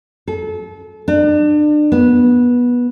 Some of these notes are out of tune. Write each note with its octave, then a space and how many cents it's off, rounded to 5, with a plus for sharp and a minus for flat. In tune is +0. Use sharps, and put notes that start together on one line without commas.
A4 -30
D4 +35
B3 -15